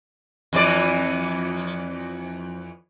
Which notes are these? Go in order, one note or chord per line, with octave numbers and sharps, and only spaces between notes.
F2 E3 D5